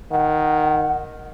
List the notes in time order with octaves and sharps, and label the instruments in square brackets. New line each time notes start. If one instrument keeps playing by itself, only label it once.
[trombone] D#3 [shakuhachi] F#5